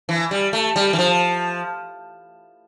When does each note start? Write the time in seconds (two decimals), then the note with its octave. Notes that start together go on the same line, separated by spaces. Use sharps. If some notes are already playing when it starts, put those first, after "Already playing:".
0.09 E3
0.31 G3
0.53 A3
0.76 G3
0.93 E3
0.99 F3